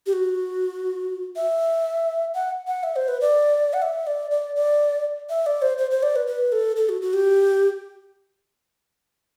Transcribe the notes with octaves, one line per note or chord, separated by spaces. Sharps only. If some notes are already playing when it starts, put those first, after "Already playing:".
G4
F#4
E5
F#5
F#5
E5
C5
B4
D5
F#5
E5
D5
D5
D5
E5
D5
C5
C5
C5
D5
B4
B4
A4
A4
F#4
F#4
G4